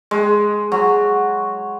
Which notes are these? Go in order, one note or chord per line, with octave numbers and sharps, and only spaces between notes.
G#3
F#3